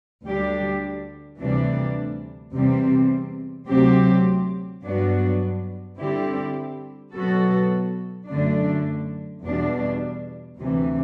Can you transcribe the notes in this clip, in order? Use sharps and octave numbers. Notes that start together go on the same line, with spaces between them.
D2 D3 G3 D4 G4
D2 C3 E3 G3 D4
E2 C3 G3 C4
D2 C3 F#3 C4 G4
G2 F#3 B3 D4 F#4
D3 G3 C4 E4 G4
B2 F#3 B3 F#4 A4
F#2 D3 A3 D4
E2 B2 G3 D4
D2 C3 E3